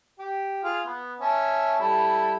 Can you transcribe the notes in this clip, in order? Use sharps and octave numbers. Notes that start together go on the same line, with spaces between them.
G4
F4 G#4 F6
B3
C#4 E5 A5
G3 E4 A4